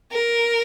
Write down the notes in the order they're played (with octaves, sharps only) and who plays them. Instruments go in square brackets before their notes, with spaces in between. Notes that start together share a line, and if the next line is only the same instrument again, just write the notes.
[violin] A#4